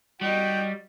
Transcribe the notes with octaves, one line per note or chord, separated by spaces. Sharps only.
G3 F#4 D#5 G5